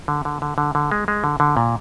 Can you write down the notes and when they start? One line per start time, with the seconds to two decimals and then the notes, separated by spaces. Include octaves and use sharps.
0.08 D3
0.25 D3
0.42 D3
0.58 D3
0.75 D3
0.91 G#3
1.08 G#3
1.24 D3
1.40 D3
1.57 A#2